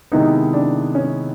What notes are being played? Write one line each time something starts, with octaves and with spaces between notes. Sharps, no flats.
C3 D#3 G#3 B3 D#4 E4
D4
C#4